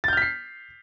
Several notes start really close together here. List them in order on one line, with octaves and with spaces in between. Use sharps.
A6 G6 F6 B6 C7